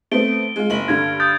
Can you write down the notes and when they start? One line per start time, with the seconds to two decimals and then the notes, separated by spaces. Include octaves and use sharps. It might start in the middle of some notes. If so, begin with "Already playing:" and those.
0.12 A3 B3 C4 D7 G7
0.28 D7
0.56 G#3 F4
0.70 F#1 F#7
0.88 G2 D3 G#6
1.20 D#6 G6 A6